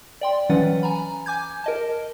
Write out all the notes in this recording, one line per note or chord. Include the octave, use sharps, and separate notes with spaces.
D5 G5 C6
E3 F#3 C#4 B4 F#5 A6
G#5 A#5 B5
G#5 D6 G6 G#6
A#4 D#5 A5